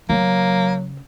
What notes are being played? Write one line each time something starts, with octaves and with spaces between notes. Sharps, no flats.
C#3 F#3 A#3